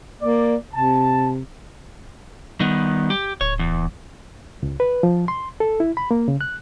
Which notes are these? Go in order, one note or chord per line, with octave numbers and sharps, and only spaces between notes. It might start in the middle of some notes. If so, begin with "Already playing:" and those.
A#3 D5
C3 A5
D#3 G3 B3
G4
D1 C#5
E2
C#2
B4
F3
C6
A4
E4
B5
A#3
C#3
F#6